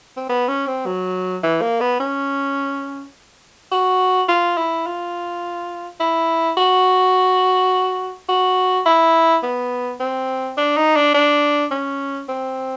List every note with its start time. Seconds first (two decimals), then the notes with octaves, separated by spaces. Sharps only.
0.17 C4
0.29 B3
0.48 C#4
0.67 C4
0.86 F#3
1.43 E3
1.62 A#3
1.81 B3
2.00 C#4
3.72 F#4
4.29 F4
4.57 E4
4.86 F4
6.00 E4
6.57 F#4
8.29 F#4
8.86 E4
9.43 B3
10.00 C4
10.58 D4
10.77 D#4
10.96 D4
11.14 D4
11.71 C#4
12.29 C4